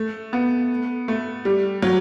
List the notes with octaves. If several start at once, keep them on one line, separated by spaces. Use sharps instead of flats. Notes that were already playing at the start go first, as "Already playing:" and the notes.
Already playing: A3
B3
A3
G3
F#3